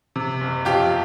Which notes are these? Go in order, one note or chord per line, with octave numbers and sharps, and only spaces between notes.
C3
F#1
F2 F4 G4